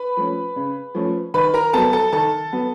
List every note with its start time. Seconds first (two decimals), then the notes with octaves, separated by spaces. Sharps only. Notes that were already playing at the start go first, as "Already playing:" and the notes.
Already playing: B4 B5
0.17 F3 A3 C#4
0.56 C#3
0.95 F3 A3 C#4
1.34 D#3 B4 B5
1.54 A#4 A#5
1.73 F#3 B3 A4 A5
1.93 A4 A5
2.13 D#3 A4 A5
2.52 F#3 B3